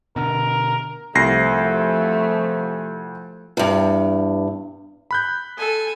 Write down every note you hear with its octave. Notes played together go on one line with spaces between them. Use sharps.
B2 D3 A#4
C2 F3 A3 A#6 C7
E2 G2
B5 F#6 G6
A4 G#5